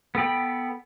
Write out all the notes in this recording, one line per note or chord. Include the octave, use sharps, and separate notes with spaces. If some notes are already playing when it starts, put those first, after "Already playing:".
B3 A4 G5 B5